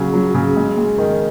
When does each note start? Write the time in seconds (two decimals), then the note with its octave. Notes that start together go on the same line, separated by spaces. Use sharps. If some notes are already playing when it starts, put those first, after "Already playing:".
Already playing: C#3 F#3
0.14 F#3
0.35 C#3
0.56 G#3
0.77 G#3
0.98 D#3